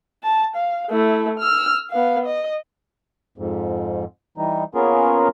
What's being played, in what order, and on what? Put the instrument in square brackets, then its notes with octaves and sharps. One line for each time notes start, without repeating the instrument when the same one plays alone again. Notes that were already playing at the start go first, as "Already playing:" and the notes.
[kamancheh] A5
F5
A3 E4
E6 F6
B3 F5
D#5
[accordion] F2 G#2
E3 G3 D#4
A#3 B3 C#4 F4 G#4 A#4